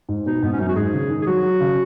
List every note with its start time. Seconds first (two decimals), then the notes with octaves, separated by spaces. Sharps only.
0.09 G#2
0.26 B2 D#4
0.42 G#2 B3
0.52 C#4
0.59 F#2 D#4
0.68 F#4
0.76 G#2 G#4
0.93 C#3
1.10 D#3
1.22 G#4
1.26 F#3 F#4
1.43 F#3
1.60 C#3